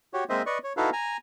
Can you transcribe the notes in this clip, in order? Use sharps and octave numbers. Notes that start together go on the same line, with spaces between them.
F#4 G4 C#5
G#3 A#3 C4 C5 D#5 E5
B4 D5 D#5 C#6
C#5
D#4 E4 F#4 A4 B4 F5
G#5 A#5